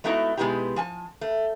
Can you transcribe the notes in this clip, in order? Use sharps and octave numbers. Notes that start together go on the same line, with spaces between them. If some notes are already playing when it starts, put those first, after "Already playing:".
G#3 A3 B3 D#4 E4 F#4
B2 G#3 B3 D#4 E4 G4
F3 G#5 A5
A3